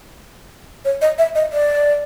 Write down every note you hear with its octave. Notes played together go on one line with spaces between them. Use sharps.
C#5
D#5
E5
D#5
D5